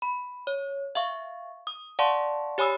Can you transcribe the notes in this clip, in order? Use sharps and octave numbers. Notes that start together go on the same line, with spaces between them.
B5
C#5
E5 F5 C#6
D#6
D5 F5 F#5 A5 C6 C#6
G4 C#5 G#5 B5 D#6 E6